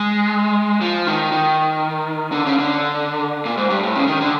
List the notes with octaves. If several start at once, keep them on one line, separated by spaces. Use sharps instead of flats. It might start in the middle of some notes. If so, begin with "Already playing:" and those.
Already playing: G#3
F3
D#3
D#3
D3
C#3
D3
A#2
G#2
G2
A2
C#3
D#3
D3